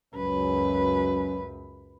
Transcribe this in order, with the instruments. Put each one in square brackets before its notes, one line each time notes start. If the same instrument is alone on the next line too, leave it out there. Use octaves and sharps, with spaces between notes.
[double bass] C#2 F#2 [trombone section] F#3 C#4 [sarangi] B4